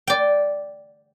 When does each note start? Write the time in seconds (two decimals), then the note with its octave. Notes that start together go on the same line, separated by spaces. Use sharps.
0.07 D5 G5